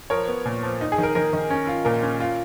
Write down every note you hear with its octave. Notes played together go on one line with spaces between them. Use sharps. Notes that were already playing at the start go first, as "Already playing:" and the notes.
F3 A#4 C#5
B3
A#2
F3
D#4
G#4
D#3
A#4
D#3 A#4
D#3
C#4
F4
A#2 A#4
C#4
F4